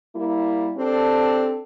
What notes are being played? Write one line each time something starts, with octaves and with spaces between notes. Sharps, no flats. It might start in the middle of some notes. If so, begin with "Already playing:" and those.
G3 A#3 E4
C4 D4 G4 A4